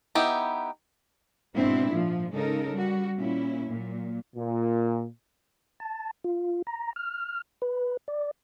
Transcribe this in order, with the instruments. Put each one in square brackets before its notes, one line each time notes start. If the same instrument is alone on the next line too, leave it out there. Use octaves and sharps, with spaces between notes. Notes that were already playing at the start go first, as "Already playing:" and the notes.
[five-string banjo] B3 D#4 E4 G4
[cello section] G#2 B2 C4 D4 E4
A#2 F3
C#3 G#3 D#4 A4 A#4
G3 F#4
A#2 C#4 E4
A#2 F#3
[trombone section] A#2
[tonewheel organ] A5
F4
A#5
F6
B4
D5